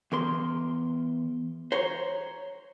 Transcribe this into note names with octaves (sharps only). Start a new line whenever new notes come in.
E2 A#4 C6
C5 C#5 A#5